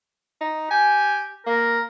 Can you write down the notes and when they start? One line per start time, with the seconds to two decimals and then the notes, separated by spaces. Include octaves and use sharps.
0.41 D#4
0.71 G4 G#5
1.47 A#3 A#4